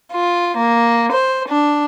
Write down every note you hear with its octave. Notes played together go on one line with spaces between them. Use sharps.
F4
A#3
C5
D4